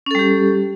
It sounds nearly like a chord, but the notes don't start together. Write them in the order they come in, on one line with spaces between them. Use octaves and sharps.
C#4 A4 G3 G4